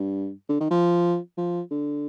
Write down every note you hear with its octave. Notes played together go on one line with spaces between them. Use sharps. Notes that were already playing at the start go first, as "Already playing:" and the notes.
Already playing: G2
D3
D#3
F3
F3
D3